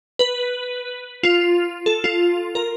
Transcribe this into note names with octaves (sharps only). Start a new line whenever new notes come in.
B4
F4
A4
F4
A#4